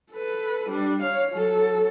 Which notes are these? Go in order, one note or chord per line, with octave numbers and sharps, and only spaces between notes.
A4 B4
G3 D4
C#5 F5
F#3 A4